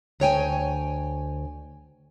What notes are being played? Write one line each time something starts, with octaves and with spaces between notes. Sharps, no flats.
D2 C#5 G5 G#5